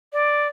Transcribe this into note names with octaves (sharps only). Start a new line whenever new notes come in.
D5